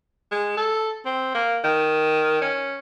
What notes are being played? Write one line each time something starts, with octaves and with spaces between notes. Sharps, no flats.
G#3
A4
C4
A#3
D#3
C#4